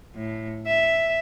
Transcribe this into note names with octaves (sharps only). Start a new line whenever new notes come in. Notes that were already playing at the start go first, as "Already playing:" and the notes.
A2
E5